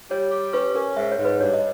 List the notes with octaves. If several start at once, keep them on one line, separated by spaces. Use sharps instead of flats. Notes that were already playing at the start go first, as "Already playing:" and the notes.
G3 C#5
G4
C#4 B4
C#4 A#4
G#2 E5
C#5
G#2
B4
G2 C#5
D#5